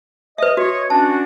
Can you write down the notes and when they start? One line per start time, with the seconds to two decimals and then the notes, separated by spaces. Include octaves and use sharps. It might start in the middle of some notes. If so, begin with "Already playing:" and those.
0.38 B4 D#5 E5
0.57 F#4 C#5 D#5
0.90 C#4 D4 F#4 A5